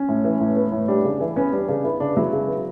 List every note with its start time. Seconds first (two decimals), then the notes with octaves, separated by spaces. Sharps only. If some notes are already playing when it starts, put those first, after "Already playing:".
Already playing: C#4
0.09 A2
0.25 E3
0.41 A2
0.56 B3
0.72 A2
0.88 G3 D4
1.04 C#3
1.20 E3
1.36 B3 C#4
1.52 G3 D4
1.68 C#3 D4
1.84 B3 E4
2.00 C#3 D4
2.17 F#3 E4
2.32 C#3
2.48 B3